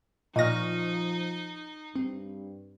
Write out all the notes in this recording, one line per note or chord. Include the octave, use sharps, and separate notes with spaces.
A#2 F3 D#4 D#5 C#6 F6 A#6
G2 C4